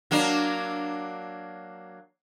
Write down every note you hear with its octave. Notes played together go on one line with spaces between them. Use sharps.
F#3 A#3 D4